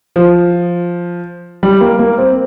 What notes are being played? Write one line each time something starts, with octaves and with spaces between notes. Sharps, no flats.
F3
G3
A#3
A#3
C4